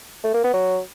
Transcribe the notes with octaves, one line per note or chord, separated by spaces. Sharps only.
A3
A#3
B3
F#3